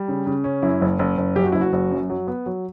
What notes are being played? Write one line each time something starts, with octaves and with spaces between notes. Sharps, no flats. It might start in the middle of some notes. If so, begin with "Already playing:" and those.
Already playing: G3
C#3
C#3
C#4
F#2 E4
F#1
F#1
F#1
F#2 G4
F#4
F#1 E4
F#4
F#1
F#2
F#3
B3
F#3